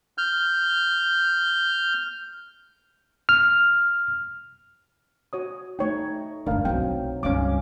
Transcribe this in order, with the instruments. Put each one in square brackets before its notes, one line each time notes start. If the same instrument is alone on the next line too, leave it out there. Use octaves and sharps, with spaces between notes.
[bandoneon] F6 G6
[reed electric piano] F6
[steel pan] F#4 C#5 D#6
[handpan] A3 D#4 [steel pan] C#5 G5
[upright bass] D2 G2 [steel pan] D4 A#4 F5
[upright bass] B1 D4 [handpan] F#3 C4 [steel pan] G5
[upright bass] C#2 G2 [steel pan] C#4 F5 D6